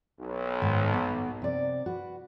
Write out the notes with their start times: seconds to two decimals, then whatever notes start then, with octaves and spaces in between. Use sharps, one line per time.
0.21 B1
0.62 G#2 D#3
0.94 B3
1.42 C3 D5
1.86 F#4 B4